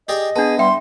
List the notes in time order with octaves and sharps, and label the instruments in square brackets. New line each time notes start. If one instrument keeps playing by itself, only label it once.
[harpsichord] G4 G#4 D5 [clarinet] D#5
[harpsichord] B3 [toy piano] D4 A5 [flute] G#4
[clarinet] G3 [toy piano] E5 F#5 G5 [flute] C6